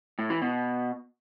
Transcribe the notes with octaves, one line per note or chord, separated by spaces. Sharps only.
A2
E3
B2